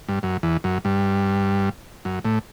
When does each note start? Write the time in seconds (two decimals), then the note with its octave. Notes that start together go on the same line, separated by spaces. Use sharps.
0.09 G2
0.23 F#2
0.43 E2
0.64 F#2
0.85 G2
2.05 F#2
2.25 A2